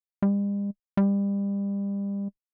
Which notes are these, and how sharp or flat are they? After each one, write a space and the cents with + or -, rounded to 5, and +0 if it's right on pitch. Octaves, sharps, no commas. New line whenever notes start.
G3 +45
G3 +30